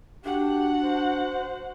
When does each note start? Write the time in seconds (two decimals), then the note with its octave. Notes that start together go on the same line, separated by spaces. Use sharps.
0.24 D4 F#4 G4 F#5
0.83 C5